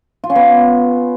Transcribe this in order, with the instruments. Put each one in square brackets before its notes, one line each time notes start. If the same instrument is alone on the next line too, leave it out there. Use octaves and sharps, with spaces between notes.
[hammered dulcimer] F4
C#4
B3